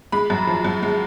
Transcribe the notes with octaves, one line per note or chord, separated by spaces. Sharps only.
G#3 B5
F#2
F3
F#2
G#3